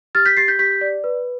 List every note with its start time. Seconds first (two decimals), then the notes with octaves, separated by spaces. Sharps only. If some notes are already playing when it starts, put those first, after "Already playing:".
0.15 G4 F6 A6
0.26 G6 B6
0.37 G4 A6 C7
0.48 G6 B6
0.59 G4 G6 B6
0.81 D5
1.04 B4